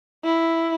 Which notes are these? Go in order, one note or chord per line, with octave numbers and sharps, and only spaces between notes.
E4